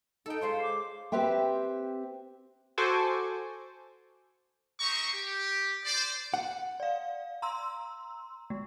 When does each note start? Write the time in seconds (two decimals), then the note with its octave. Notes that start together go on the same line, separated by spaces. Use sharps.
0.26 D#4 A4 G5
0.41 G#3 F4 C5 C#5
0.62 D6
1.12 C4 G4 B4 C5 E5 G5
2.78 F#4 A4 C5 G#5 C#6 D6
4.80 C4 G4 C5 D#5 A#5 C#6
5.13 G4
5.85 C5 D5
6.34 F#5
6.80 D5 F5
7.42 A#5 C6 E6
8.50 G#3